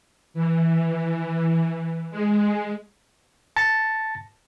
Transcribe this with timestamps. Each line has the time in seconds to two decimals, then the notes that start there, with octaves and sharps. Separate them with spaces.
0.34 E3
2.11 G#3
3.56 A5 A6 A#6 C#7